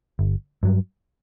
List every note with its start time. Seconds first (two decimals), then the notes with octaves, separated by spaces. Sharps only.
0.19 G1
0.63 G2 F#3